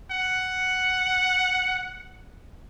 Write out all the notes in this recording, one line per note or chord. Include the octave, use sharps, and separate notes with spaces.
F#5